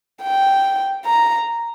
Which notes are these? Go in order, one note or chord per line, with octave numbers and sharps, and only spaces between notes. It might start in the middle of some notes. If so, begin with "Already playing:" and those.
G5
A#5